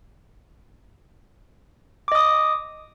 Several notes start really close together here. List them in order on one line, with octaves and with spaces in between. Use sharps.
D6 D#5 D#6